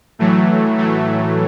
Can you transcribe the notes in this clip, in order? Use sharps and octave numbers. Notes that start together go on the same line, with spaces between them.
A2 E3 F#3 A3
F#3 A3